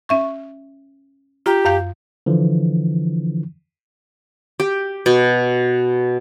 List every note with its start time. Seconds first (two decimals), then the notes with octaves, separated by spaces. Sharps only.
0.09 C#4 E5 C#6
1.46 F4 G4 A#5
1.65 F#2 F5 G6
2.26 D3 E3 F3
4.60 G4
5.06 B2